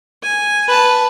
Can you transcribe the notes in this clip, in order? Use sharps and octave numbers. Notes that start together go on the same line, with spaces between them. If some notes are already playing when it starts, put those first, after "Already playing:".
G#5
B4 A5